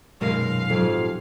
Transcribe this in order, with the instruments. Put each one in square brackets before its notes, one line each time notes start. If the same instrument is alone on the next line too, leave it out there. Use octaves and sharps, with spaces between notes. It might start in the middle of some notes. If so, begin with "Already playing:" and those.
[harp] D#1 F#2 B2 [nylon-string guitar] G#3 D#4 A#4 [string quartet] F5
[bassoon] F2 [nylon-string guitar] G#2 F#3 [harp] F3 G4 G#4